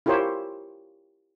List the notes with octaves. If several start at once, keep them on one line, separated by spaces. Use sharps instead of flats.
E4 F4 G4 A#4 C5 C#5